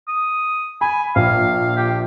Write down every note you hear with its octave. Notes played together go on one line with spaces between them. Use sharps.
D#6
G#5 B5
A#1 F5
G4